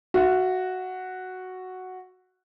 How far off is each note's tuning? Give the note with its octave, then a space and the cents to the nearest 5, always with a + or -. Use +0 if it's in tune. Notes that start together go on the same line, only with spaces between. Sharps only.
F#4 +0 E5 +35